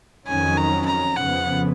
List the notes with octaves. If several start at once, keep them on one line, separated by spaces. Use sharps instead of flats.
F2 D#3 F#3 C#4 G#5
A#5
A#5
F2 C#3 F3 B3 F#5